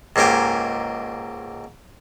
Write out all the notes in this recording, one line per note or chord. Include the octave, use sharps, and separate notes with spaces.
C#2 G#2 A#3 G4 G#5